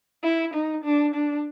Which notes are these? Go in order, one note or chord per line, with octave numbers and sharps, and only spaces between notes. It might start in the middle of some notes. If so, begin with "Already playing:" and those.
E4
D#4
D4
D4